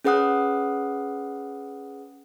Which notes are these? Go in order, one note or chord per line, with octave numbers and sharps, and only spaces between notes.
C#4 G#4 B4 F#5 D#6 F#6